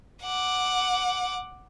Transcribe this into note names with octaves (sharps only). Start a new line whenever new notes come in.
F#5 D6